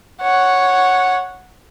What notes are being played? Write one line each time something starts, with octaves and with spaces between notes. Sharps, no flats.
C#5 F#5